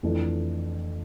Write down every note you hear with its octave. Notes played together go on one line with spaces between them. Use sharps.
F2 E3 A3 D4 A4